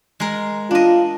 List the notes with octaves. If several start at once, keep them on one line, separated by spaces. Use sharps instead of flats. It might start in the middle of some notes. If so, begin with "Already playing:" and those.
G#3 A#4
D4 F4 D#5